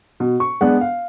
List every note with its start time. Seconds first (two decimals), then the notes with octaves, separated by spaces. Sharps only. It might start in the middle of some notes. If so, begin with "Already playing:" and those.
0.20 B2
0.40 C#6
0.61 G#3 B3 D4 F#5
0.81 F5